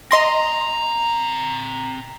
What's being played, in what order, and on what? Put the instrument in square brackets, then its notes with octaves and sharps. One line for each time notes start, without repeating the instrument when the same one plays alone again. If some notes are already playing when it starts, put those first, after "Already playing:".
[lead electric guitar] C4 A#5 [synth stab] D#5 C6 A#6